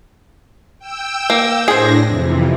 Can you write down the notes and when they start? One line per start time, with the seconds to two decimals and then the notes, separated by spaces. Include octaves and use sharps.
0.79 G5 E6
1.30 A#3
1.68 A2 D4 G#4 C5 A#6
2.06 F2 C3 E3